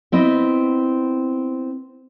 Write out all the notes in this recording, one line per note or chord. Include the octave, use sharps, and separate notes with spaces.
B3 C4 E4 D#5